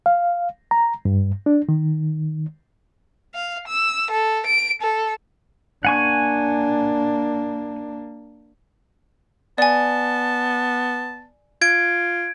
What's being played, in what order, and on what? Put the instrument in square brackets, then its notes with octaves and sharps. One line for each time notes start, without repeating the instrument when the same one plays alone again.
[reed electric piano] F5
A#5
G2
D4
D#3
[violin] F5
E6
A4
D7
A4
[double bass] A#3 D4 [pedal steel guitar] F#5 G#5 C#6
[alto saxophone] B3 [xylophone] D5 G#5 [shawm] A5
[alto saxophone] F4 [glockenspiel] G#6 D7